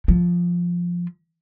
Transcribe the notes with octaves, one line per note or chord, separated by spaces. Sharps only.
F3